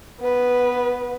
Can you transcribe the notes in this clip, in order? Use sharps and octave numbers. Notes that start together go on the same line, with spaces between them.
B3 B4